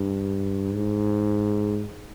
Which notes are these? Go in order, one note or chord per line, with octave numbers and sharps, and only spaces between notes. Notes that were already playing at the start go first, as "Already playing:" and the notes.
Already playing: G2
G#2